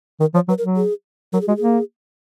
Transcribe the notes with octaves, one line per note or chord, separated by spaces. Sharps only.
D#3 A#4
F3 C#5
F#3 B4
A#4
F#3
G#4
F#3 A#4
G#4
G#3 F#4
G#4
A#3